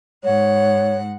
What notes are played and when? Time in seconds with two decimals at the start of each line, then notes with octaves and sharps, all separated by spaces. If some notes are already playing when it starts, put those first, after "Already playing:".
0.24 G#2 C#5 F#5